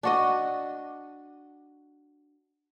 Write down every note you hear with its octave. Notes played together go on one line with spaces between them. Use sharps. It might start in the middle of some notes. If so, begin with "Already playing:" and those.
D4 F#4 D#5